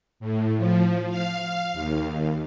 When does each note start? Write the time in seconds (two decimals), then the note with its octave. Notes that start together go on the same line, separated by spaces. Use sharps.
0.20 A2
0.57 F3
1.09 F5
1.73 D#2